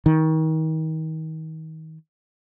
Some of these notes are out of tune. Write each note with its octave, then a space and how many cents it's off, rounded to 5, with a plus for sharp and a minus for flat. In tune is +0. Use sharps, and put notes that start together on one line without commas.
D#3 +35